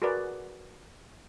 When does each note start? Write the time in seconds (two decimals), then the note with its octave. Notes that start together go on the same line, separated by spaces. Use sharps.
0.02 F#4 G#4 A#4 B4 D5